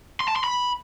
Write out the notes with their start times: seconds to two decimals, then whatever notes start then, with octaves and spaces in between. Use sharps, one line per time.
0.20 C6
0.28 A5
0.36 C6
0.44 B5